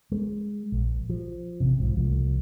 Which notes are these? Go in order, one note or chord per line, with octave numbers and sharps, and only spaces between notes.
G#3
A#1
F3
A1 C3
B1 G#2 F3
C2 F3 G3 A3